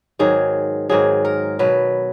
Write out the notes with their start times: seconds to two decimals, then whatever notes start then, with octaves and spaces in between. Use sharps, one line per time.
0.19 G#2 D#3 F#3 G#4
0.89 G#2 D#3 F#3 G#4
1.25 A#4
1.59 B2 F#3 B4